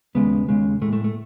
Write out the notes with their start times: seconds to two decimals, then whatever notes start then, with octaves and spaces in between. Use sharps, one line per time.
0.15 D#2 C#3 G#3 B3
0.49 D#2 C#3 G#3
0.82 A2 G#3 A3
0.93 A3
1.04 A3